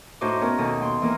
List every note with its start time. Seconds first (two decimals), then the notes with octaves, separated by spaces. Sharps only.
0.21 A2 D#4 F#4 C5 D#5 D6
0.41 B3 C#4 A#4
0.58 D#2 B2 A4 D#6
0.81 B3 G5 C6
1.02 E3 A#3 A#4